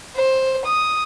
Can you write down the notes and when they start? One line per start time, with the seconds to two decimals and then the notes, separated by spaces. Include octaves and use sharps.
0.15 C5
0.65 D#6